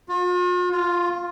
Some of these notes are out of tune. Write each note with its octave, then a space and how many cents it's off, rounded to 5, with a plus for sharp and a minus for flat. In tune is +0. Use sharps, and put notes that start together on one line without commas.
F4 +45
F4 +0